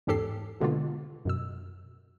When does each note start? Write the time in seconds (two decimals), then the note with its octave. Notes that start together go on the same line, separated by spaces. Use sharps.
0.07 E2 G#2 C#4 G4 A4 C7
0.61 B2 D3 G#3 A#3 B3 F4
1.25 F#2 B2 E6